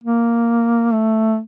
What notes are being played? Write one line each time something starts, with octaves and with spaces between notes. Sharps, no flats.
A#3
A3